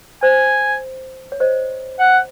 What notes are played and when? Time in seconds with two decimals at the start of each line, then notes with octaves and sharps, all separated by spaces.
0.22 C5 G#5
1.32 C#5
1.40 C5 D#5
1.99 F#5